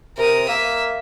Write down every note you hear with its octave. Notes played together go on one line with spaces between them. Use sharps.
C3 A#4 D#6
A#3 E5